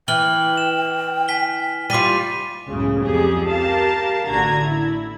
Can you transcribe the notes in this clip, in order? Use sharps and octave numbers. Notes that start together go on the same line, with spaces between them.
E3 G5 F6 F#7 G7
E7
G#5 B6 G7
G3 F4 D6 B6 D#7
C#2 F#2 A2 C#3
F2 G4 G#4
G4 A#4 F5 A5
A1 D3 F#4 A#5 G#6
E4